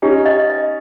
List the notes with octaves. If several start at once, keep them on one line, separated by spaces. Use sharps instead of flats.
C#4 D#4 G4
D#5
D#5